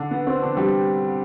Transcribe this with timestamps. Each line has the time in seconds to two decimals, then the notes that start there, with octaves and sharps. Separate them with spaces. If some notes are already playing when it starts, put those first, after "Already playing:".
Already playing: D3 D4
0.11 B3
0.27 C4
0.42 D3 D4
0.57 G3 G4